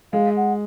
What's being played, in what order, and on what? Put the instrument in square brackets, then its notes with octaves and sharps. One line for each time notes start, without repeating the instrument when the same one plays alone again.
[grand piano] G#3 [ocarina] F5
[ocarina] F#5